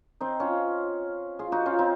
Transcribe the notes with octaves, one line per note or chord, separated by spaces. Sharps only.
C4 D#4
C#4 F4
F4 G#4
D#4 F#4
C#4 F4
C4 D#4